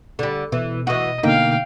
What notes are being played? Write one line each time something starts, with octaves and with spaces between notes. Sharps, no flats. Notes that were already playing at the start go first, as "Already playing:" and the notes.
D3 G3
B2 E3
E3 F#4 D#5
B2 D3 A#3 D#4 F5 G5